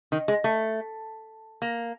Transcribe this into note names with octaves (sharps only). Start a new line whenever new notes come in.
D#3
G#3
A3
A#3